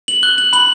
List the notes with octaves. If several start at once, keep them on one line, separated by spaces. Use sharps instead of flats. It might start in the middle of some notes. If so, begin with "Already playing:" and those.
F#7
F#6 G7
F#7
B5 F#7